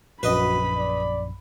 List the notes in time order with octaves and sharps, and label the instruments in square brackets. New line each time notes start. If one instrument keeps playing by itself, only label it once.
[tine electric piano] A#1 F#2 [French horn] F#4 [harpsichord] B4 D#5 [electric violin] B5
[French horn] D5